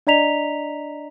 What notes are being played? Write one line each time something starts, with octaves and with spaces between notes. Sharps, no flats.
D4 D5 D#5 A#5 B6 F7